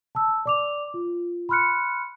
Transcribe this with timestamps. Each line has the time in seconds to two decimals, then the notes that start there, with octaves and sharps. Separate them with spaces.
0.15 A5 E6
0.46 D5 D6 F7
0.94 F4
1.49 B5 C6 F6 F#6 C#7